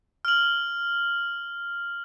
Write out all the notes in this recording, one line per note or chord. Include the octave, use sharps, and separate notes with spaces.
F6 F#7